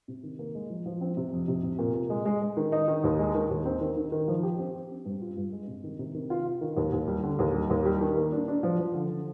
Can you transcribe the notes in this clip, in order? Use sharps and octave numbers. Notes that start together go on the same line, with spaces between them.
C3
D#3
A#3
G#3
F3
F3
C4
C3
F2
C3
C3
A#2
A#2
G#3
G#3
G#3
D#3
D#4
D#3
D#2
G#3
D#3
D#2
C4
D#3
D#3
D#3
F3
G4
C4
G4
C4
G2
F4
G2
G#3
C3
D#3
C3
D#3
F4
F4
D#3
D#2
D#2
G3
D3
D#2
G3
D#2
G3
D#3
A#3
D4
D4
F3
F3
D3
D3